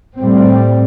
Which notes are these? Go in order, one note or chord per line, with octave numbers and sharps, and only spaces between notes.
A2 G3 C4